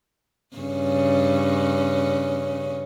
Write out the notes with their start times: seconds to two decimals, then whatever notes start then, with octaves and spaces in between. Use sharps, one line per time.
0.56 G2 C#3 C#4